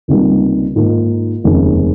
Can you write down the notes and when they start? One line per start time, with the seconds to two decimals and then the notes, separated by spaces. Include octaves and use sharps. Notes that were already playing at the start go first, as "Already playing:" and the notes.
0.08 C#2 C3 D#3 G3 A#3
0.76 G#2 D#3 A#3 F4
1.44 F1 D#2 C#3 G#3